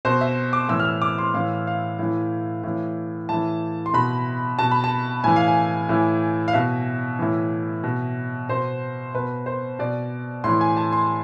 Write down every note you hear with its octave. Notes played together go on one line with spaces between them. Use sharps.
B2 C5
E5
D6
A2 E3 E6
F6
E6
D6
C6
A2 E3 F5
F5
A2 E3
A2 E3
A2 E3 A5
C6
B2 B5
B2 A5
B5
A5
A2 E3 G#5
F5
G#5
A2 E3
F5
B2 E5
A2 E3
B2
B2 C5
B2 B4
C5
B2 D5
A2 E3 C6
G#5
A5
C6